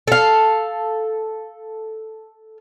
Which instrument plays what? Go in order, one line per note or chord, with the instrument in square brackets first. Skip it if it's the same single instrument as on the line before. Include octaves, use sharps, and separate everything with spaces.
[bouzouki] A4 F5